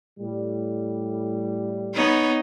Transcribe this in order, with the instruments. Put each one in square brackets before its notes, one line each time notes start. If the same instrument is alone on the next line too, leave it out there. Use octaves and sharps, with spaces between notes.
[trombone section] A2 G3
[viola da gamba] B3 D#4 C#5